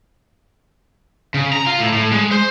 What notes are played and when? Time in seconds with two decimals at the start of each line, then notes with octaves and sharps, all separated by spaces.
1.34 C#3
1.53 A#5
1.66 F4
1.80 A2
1.93 A2
2.12 G#3
2.31 C5